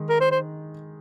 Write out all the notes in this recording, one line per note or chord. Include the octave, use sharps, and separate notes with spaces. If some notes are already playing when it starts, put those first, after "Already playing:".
Already playing: D#3 G#3 D#4
A#4
C5
C5